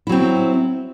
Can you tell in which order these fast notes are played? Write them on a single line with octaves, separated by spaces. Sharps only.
E4 F#3 C4